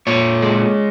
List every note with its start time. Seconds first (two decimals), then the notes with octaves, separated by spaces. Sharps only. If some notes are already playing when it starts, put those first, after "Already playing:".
0.07 A#2 C#5
0.42 G#3